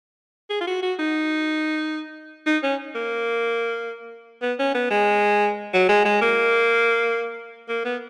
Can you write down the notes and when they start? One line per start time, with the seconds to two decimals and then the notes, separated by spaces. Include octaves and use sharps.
0.50 G#4
0.61 F4
0.67 F#4
0.82 F#4
0.99 D#4
2.46 D#4
2.63 C#4
2.95 A#3
4.42 B3
4.59 C#4
4.75 B3
4.91 G#3
5.73 F#3
5.89 G#3
6.05 G#3
6.22 A#3
7.69 A#3
7.85 B3